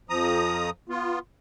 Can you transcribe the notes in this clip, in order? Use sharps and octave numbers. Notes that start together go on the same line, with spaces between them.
F2 F3 A#5 D#6
B3 F4